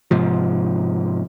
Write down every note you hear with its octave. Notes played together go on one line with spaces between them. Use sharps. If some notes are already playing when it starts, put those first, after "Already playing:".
G#2 C3 F3